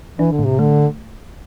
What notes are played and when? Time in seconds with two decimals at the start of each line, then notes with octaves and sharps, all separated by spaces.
0.18 E3 D4
0.32 D3
0.39 A2
0.45 C3
0.59 D3 A3